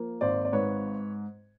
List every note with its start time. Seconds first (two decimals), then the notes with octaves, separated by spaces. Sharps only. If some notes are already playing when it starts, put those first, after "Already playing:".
Already playing: F3 A#3
0.21 G#1 C5 D5
0.45 D5
0.52 G#2 B4 C#5